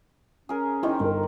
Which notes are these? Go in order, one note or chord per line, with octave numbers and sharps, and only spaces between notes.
C#4 G#4 A#4
D#3 D#4 E4 G4 C5
G1 A#4